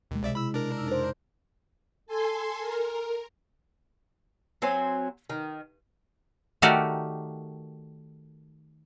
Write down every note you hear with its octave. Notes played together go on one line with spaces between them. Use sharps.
D#2 B2 G#3
C2 C3 D5 E5
E4 B5 E6
D4 A#4
F2 D#4 E6
C5
A4 G#5 C6
A#4
F#3 C4 C5 G#5
D#3
D#3 A3 F#4 G4 A#4 D5